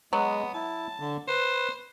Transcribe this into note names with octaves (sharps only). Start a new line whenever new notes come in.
F#3 G#3 B3
E4 A5
D3
B4 C5